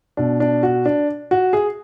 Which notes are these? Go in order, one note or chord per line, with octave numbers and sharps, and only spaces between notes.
B2 D4
D4
F#4
D4
F#4
G#4